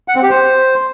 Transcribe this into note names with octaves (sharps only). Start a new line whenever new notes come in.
F#5
C4
G4
C5